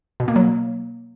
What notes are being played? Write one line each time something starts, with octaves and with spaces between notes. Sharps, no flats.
B2
A#3
F#3